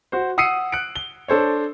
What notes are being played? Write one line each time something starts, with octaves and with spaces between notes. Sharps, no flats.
F#4 C5
F#5 D#6 E6 C7 C#7 D#7
F#6 C#7 D7
G7
D4 A4 C5 C#5